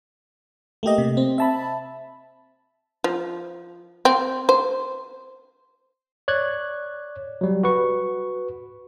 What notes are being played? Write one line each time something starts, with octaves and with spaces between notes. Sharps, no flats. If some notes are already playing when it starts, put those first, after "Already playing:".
A3 A#3 G4 D#5
C3
C4
E5 A5 B5
F3
C4
C5
C#5 D5 F#6 G#6
F#3 G3
F#4 B4 C#6